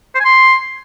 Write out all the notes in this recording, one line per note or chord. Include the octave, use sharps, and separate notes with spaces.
C5
G#5
C6